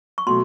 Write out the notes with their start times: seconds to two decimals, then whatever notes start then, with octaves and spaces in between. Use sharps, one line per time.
0.18 C#6
0.27 B2 F#3 A3 C6